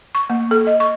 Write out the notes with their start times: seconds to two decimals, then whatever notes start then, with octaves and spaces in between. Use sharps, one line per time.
0.15 C#6
0.30 A#3
0.51 A4
0.67 D#5
0.80 C#6